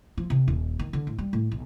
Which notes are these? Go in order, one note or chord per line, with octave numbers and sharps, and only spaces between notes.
F3
C3
D#1
D#3
D3
A2
G3
A2
B1